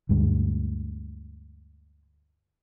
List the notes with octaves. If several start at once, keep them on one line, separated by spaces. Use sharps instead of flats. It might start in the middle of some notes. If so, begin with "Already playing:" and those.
D2 G2 G#3